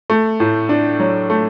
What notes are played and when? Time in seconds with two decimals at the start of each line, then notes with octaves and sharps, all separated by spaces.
0.10 A3
0.40 A2
0.69 D4
1.00 F#3
1.30 A3